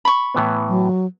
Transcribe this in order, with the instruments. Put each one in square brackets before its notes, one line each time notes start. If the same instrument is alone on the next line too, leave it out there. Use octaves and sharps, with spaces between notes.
[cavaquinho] B5 C#6
[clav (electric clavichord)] A2 E3 B3
[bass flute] F#3